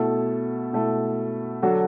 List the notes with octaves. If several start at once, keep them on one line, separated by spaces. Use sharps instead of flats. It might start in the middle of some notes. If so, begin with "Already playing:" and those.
Already playing: B2 A3 E4 A4
B2 A3 E4 A4
D3 F#3 D4 F#4 A4